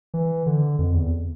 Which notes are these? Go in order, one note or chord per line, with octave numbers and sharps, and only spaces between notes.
E3
D3
F2
E2